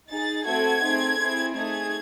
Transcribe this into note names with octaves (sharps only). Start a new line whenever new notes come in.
D#4 G#4 A6
A3 C4 F#4 A4 G#6
A3 C4 D#4 G#4
C4 E4 G#4
A3 D#4 G#4 G#6